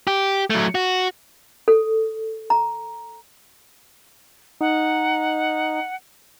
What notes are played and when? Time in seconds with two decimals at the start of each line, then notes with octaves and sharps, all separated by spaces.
0.07 G4
0.50 F#3 A3
0.75 F#4
1.68 A4
2.50 A#5
4.61 D#4 F#5